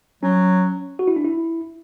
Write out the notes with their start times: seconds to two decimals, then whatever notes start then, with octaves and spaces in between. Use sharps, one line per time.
0.23 F#3 C#4
0.99 F#4
1.08 E4
1.16 D4
1.25 E4